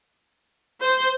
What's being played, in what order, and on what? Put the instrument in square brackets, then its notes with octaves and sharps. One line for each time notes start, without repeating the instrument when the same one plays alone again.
[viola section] C5